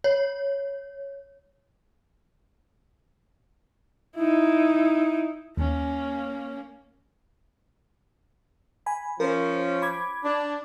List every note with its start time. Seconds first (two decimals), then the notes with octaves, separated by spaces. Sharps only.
0.04 C#5
4.16 D#4 E4
5.57 D#2 A#3 C#4
8.86 G#5 B5
9.20 F3 C#4 A#4 C5
9.82 B5 D6 G#6
10.24 D4